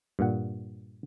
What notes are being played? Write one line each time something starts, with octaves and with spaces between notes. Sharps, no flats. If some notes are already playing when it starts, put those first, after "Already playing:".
G2 A#2 F#5